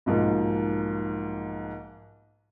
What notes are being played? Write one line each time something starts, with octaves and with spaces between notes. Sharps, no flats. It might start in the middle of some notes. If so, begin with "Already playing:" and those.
B1 G#2 F3 A#3